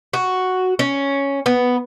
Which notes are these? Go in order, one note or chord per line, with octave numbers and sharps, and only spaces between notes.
F#4
C#4
B3